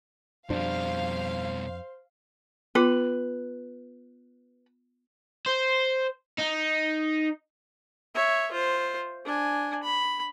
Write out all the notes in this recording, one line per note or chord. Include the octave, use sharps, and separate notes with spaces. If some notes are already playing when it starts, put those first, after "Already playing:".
F2 B2 G3 D4 C5 F5
B3 F4 B4 D6
C5
D#4
C#5 E5
F4 C5
D4 G#5
B5